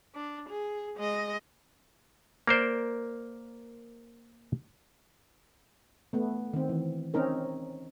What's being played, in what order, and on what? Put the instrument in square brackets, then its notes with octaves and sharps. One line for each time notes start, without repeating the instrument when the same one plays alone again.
[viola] D4
G#4
G#3 D#5
[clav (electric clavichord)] A#3 A#4 C5 D5
[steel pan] A3 B3
D#3 C4
E3
C4 C#4 D#4 A#4